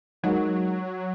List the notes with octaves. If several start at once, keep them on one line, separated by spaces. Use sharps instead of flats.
F#3 G#3 D#4 F#4 A#4